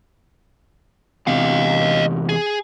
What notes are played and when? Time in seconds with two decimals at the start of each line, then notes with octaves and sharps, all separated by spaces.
1.27 E2 C3 D#5 F5
2.29 G#4